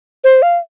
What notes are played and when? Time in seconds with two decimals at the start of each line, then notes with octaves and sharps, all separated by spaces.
0.24 C5
0.42 F5